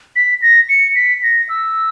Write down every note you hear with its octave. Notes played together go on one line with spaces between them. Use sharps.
B6
A#6
C#7
B6
A#6
E6